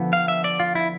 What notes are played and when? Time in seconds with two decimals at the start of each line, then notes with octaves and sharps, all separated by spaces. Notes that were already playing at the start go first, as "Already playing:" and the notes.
Already playing: D3 F3 B3
0.13 F5
0.28 E5
0.44 D5
0.60 F4
0.75 E4